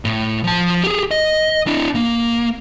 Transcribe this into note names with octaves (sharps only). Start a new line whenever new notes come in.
A2
F3 A5
G4 G#4
D#5
D4 E4
A#3